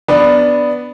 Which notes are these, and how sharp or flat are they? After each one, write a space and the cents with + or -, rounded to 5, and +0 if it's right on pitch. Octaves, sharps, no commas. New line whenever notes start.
B3 +0 D4 +0 B4 +0